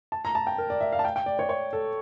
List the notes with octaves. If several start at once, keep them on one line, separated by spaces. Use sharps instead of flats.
A5
A#5
A5
G5
A#4
D5
E5
F5
A5
G5
G5
D5
C#5
C#5
A4